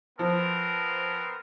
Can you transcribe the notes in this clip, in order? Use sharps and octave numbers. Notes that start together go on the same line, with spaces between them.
F3 B3 C4 A#4